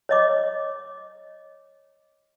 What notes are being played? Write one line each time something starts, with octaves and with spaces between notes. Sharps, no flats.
C#5 D#5 D6